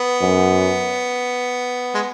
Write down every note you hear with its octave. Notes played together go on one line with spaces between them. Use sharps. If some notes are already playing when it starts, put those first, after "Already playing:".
Already playing: B3
F#2
G#3